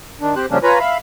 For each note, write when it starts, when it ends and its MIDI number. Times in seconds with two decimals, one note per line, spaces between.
0.21 0.35 51
0.21 0.35 62
0.36 0.46 60
0.36 0.46 67
0.36 0.46 72
0.36 0.46 90
0.51 0.58 49
0.51 0.58 53
0.51 0.58 55
0.51 0.58 58
0.51 0.58 61
0.51 0.58 62
0.63 0.79 65
0.63 0.79 71
0.63 0.79 73
0.63 0.79 80
0.63 0.79 82
0.63 0.79 83
0.79 0.98 76
0.79 0.98 77
0.79 0.98 83